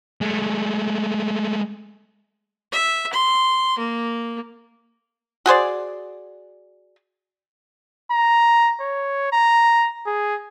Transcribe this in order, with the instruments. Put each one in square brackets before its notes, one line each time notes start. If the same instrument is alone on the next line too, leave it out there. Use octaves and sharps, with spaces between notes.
[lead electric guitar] G#3 A3
[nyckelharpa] E5
C6
A#3
[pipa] F#4 G#4 C5 D5
[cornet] A#5
C#5
A#5
G#4